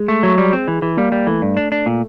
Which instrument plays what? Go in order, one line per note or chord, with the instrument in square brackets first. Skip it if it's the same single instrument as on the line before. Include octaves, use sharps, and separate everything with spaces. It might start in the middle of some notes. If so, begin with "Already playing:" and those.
Already playing: [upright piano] G#3
[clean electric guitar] A3
F#3
G3
C4
E3
E3
[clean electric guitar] G3 [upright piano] A#3
[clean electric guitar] G3
[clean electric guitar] E3 [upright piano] A3
[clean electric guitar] G2
D4
D4
A#2